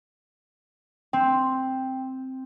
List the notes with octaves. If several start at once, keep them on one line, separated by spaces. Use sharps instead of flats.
C4 G5